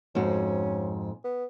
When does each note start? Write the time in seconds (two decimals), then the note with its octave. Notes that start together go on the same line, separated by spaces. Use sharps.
0.15 F2 G#2 C#4 F#4
1.25 B3